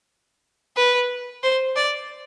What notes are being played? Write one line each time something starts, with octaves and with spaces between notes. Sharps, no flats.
B4
C5
D5